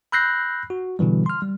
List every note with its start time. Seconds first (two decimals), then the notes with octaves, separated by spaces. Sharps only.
0.12 B5 E6 F#6 G6 A#6 C7
0.70 F#4
0.99 B2 D3 E3 G3
1.26 C6 F6
1.42 G3